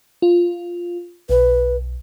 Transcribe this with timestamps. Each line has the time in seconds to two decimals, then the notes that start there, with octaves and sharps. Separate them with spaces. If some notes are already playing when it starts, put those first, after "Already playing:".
0.22 F4
1.29 B1 B4